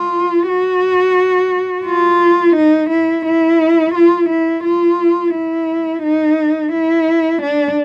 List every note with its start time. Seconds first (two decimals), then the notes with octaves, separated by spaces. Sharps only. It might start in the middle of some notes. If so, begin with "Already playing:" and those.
Already playing: F4
0.48 F#4
1.86 F4
2.56 D#4
2.90 E4
3.26 E4
3.95 F4
4.29 E4
4.64 F4
5.34 E4
6.03 D#4
6.73 E4
7.42 D4